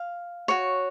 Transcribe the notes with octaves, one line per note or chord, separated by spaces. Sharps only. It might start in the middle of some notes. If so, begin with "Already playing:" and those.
Already playing: F5
F#4 C#5